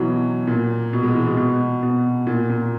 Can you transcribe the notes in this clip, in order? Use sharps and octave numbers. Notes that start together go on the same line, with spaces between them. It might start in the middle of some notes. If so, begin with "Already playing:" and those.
Already playing: B2 E3 F#3
A#2
B2
G#3
E3
B2
B2
B2
A#2
A#2